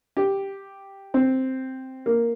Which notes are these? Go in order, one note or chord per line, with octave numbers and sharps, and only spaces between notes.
G4
C4
A#3